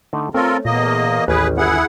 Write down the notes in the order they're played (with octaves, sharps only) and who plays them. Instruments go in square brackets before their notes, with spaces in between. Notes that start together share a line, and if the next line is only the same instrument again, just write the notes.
[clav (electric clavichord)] D3 A3 D#4
[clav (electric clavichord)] A3 C#5 [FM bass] C4 [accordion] F4 A4 A#4
[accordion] E2 A#3 D#5 [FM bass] A#2
[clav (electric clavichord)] A1 C#4 G4 [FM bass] D#2 [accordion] G#4 B4
[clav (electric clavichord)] G1 [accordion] E4 G#4 F#5